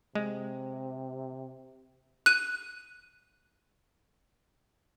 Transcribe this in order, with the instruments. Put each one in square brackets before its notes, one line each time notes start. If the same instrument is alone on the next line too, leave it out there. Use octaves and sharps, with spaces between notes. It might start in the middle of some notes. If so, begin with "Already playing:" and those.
[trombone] C3 [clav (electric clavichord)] G#3
[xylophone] F#6 D#7